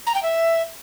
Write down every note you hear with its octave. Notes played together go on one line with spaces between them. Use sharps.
A#5
G5
E5